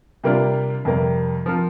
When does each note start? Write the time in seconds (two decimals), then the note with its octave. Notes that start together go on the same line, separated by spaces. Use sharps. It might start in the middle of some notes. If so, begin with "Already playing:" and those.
0.24 C3 G3 A#3 D4 F4
0.85 F2 C3 G3 A#3
1.46 F3 C4 F4 A#4